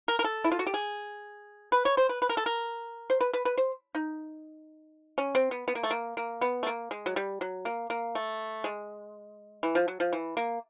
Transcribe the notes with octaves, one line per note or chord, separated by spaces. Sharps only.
A#4
A#4
A4
E4
F4
F#4
G4
G#4
B4
C#5
C5
B4
B4
A#4
A4
A#4
C5
B4
B4
B4
C5
D#4
C#4
C4
B3
B3
A#3
A3
A#3
A#3
B3
A3
A#3
G#3
F#3
G3
F#3
A#3
A#3
A3
G#3
E3
F3
F#3
F3
E3
A#3